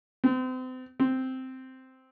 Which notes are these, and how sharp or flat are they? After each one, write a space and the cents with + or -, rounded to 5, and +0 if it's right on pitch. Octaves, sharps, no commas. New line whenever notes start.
C4 -35
C4 -5